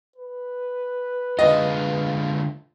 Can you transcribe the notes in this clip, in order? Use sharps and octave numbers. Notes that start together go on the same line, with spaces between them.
B4
D3 G#3 F4 D#5